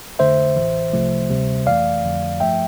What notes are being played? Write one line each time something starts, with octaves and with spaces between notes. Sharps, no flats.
F2 D3 A3 C5 E5
A1 A2 E3
C2 C3 F3 A3
D2 C3 G3
F2 E3 A3 D5 F5
F2 D3 F3 A3
G2 F3 A3 E5 G5